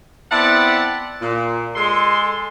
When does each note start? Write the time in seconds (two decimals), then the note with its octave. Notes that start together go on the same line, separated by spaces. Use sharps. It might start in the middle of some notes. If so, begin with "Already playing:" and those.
0.31 B3 C4 E4 D5 F#5 A5
1.21 A#2
1.75 G#3 A4 C6